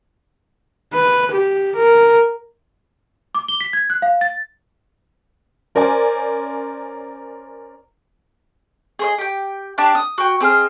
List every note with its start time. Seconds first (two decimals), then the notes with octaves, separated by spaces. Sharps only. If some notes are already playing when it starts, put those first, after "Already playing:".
0.93 B4
1.31 G4
1.76 A#4
3.35 D6
3.48 G7
3.61 B6
3.73 G#6
3.90 F#6
4.02 F5
4.21 A6
5.75 C#4 A#4 C5 D5 G#5
8.99 G#4 C5 D#5
9.18 G4 G5
9.78 D4 G4 D5 A5
9.95 D#6
10.18 F#4 G5
10.41 C4 G#4 D#5 F6